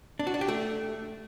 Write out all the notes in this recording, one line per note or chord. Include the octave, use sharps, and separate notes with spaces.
D4
F#4
D4
G4
A3